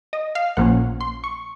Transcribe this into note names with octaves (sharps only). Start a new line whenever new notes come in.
D#5
F5
A#1 A#2 F3 A#3 C#4 F#5
C6
C#6